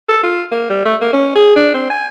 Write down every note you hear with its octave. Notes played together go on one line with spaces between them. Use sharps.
A4
F4
A#3
G3
A3
A#3
C#4
G#4
D4
C4
G#5